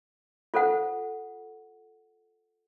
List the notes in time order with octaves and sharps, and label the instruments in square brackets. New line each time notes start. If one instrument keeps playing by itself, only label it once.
[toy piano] F4 A4 C5 F#5